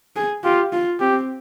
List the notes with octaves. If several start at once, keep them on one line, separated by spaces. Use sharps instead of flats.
G#4
F4 G4
F4
C4 G4